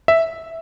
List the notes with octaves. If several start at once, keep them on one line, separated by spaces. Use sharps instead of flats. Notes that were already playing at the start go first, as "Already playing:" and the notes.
E5